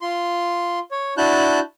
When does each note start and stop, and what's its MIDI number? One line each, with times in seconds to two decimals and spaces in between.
0.01 0.79 65
0.01 0.79 84
0.91 1.14 73
1.18 1.59 62
1.18 1.59 64
1.18 1.59 66
1.18 1.59 81
1.18 1.59 90
1.18 1.59 91